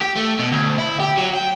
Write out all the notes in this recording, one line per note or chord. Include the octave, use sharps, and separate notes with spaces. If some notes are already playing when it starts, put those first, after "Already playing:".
G4
A3
B2
D2
E4
G4
F#3
G5